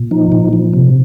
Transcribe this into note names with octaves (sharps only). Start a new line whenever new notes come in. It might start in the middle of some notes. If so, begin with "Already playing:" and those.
Already playing: A#2
F3 D#4
A#2
F3
C3